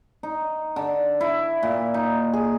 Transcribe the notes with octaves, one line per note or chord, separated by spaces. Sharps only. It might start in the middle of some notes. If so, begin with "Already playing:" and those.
D#4
D3
E4
A#2
D#4
G#4